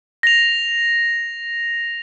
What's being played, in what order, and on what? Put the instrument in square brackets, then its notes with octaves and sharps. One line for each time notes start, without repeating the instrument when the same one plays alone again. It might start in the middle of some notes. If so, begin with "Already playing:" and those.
[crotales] A#6 F7